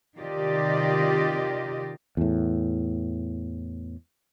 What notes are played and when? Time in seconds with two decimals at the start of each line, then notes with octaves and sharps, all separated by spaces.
0.18 C3 D#3 F4 G4 D5 D#5
2.17 E2 A2